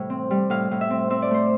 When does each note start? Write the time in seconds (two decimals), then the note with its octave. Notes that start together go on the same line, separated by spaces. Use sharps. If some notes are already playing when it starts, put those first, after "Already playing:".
Already playing: A2 C3 E3 G3
0.10 C4
0.31 G3
0.50 A2 F5
0.71 A2
0.81 E5
0.90 C4
1.10 C4 E5
1.22 D5
1.31 A3 C5